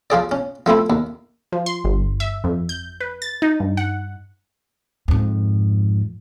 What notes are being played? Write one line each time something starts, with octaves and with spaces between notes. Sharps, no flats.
F3 F4 G#4 D5
C#4
F3 A3 C4 E4
D#2
F3
C6
G1
E5
F2
G6
B4
A6
D#4
G2
F#5
F2 G#2